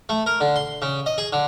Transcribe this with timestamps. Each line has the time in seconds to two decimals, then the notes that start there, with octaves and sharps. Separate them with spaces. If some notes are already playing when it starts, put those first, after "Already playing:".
0.09 A3
0.26 A#4
0.41 D3
0.56 C6
0.82 C#3
1.06 D#5
1.18 G#4
1.33 D3